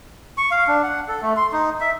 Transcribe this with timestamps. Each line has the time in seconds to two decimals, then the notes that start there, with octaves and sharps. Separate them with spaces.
0.38 C#6
0.51 F5
0.67 D4
0.83 F#5
1.08 A4
1.22 A3
1.36 C6
1.52 D#4
1.81 E5